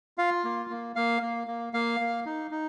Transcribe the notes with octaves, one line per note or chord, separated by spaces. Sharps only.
F4 F5
A#3
A#3
A#3 F5
A#3
A#3
A#3 F5
A#3
D#4
D#4